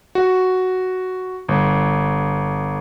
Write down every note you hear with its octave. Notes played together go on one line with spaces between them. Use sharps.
F#4
G1